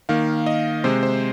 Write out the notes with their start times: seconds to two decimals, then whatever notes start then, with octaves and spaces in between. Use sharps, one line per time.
0.09 D#3 A#3 F5
0.46 D#5
0.84 C3 G#3 C5
1.03 C5